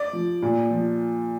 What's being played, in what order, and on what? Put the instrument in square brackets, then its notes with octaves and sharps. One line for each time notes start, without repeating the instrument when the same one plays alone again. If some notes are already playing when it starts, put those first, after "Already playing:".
Already playing: [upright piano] D5
F3
A#2
F3